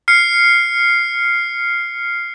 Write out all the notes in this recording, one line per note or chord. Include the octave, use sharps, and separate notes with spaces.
F6 C7 C#7